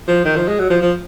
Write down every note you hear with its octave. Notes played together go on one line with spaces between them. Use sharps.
F3
D#3
F3
G#3
F#3
F3
F3